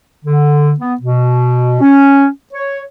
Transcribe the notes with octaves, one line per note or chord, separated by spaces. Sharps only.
D3
B3
B2
C#4
C#5